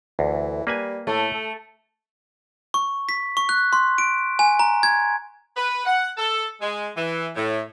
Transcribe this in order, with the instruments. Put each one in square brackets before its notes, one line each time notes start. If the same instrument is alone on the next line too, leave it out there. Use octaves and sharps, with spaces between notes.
[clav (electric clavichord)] D2 [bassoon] E3
[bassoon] G3 [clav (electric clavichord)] A#3 B4 G#5
[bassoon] A2 [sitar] A3
[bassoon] A4
[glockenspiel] C#6
B6
C#6
F#6
C6
D7
G#5
A#5
G#6
[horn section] B4
F#5
A4
G#3
E3
A2